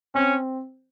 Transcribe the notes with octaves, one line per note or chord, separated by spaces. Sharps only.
C4 C#4